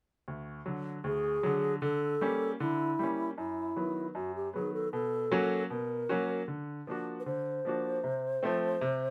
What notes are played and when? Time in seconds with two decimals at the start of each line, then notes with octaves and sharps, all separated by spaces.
0.28 D2
0.66 D3 F#3
1.04 D2 G#4
1.43 D3 F#3
1.82 D3 A4
2.21 G3 A#3 C#4
2.60 D3 E4
2.99 G3 A#3 C#4
3.38 F#2 E4
3.76 D#3 F#3 B3
4.15 F#2 F#4
4.35 G4
4.54 D#3 F#3 B3 G#4
4.74 A4
4.93 B2 A4
5.31 F#3 A#3 C#4 F#4
5.70 B2 A#4
6.09 F#3 A#3 C#4 F#4
6.48 D3
6.87 F3 A#3 D4 F#4
7.20 B4
7.26 D3 C5
7.65 F3 A#3 D4 F#4
8.04 C3
8.43 F3 A3 C4
8.81 C3